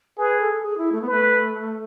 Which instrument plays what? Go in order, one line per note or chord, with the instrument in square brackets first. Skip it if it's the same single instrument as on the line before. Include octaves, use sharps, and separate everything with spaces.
[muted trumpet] G#4 [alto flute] B4
[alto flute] A4
A4
G#4
E4
A3
B3
[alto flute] A3 [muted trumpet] B4